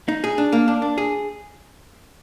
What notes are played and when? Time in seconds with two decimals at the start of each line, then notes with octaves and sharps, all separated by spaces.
0.08 D#4
0.24 G#4
0.38 D4
0.52 A#3
0.68 D4
0.82 D4
0.98 G#4